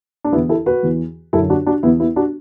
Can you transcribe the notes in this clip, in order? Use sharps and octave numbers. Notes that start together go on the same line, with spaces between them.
D4
E2 E3 B3 E4
E4 A4
F#4 B4
E2 E3
F#2 D3 E4 A4
D4 F#4
D4 F#4
E2 E3 B3 E4
B3 E4
D4 F#4